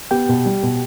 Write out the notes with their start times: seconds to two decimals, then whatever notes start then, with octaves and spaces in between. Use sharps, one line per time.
0.11 B3 G4 G5
0.29 B2
0.46 G3
0.63 B2